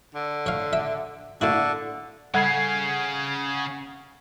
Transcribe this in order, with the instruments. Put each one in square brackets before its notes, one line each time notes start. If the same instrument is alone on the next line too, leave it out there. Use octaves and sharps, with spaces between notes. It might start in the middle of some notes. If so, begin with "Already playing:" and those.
[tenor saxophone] D3
[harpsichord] C#5 F5
E5
[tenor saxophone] D3 [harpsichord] A#3 E4 F#4
[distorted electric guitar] C#3 C#4 [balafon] G3 A4 B5 [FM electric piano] F#5 G#6 C7